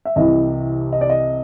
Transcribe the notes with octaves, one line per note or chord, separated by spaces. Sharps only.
E5
C2 C3 E3 D#5
D#5
D5
D#5